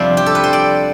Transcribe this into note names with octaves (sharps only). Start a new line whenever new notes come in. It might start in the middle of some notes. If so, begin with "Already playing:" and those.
Already playing: F2 C3 G3 D4 F4 C5
G4
A4
B4
C5
D5